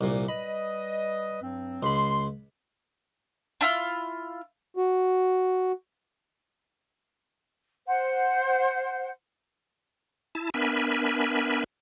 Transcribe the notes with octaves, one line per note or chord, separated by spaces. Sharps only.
C2 A#2
G3 B4 D#5 B5
G2 F#3 C4
C#2 B5 C6
D4 E4 F4
F#4
C5 F#5
E4 A5
B3 D4 A#4 E5 G#5 B5